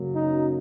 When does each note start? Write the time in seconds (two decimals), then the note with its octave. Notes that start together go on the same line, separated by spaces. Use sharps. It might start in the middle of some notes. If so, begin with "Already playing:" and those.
Already playing: F#2 C#3 F#3 A#3
0.15 D#4